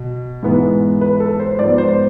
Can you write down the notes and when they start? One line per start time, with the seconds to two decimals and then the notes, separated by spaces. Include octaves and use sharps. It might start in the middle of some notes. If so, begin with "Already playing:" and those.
Already playing: B2
0.43 G#2 E3 B3
1.01 B4
1.20 A4
1.40 C5
1.59 G#2 F3 B3 D5
1.78 C5